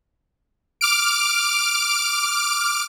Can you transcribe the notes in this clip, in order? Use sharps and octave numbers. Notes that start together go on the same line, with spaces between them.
D6 F6 D7